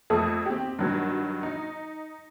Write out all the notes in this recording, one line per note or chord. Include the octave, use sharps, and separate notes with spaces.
F2 A3 A4 D#6
C4 G4
G2 D#3 F#3
D#4